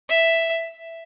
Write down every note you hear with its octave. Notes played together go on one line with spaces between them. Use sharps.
E5